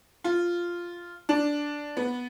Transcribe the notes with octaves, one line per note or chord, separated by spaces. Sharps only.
F4
D4
B3